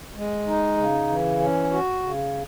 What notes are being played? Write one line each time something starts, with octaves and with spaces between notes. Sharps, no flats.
G#3
D#4
C#3
E3
C#4
F#4
C#3